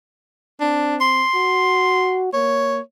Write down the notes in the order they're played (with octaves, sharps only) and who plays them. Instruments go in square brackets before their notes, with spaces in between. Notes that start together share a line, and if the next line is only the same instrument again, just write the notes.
[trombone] C4 [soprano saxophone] D4
[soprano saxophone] C6
[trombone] F#4
[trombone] A#3 [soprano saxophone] C#5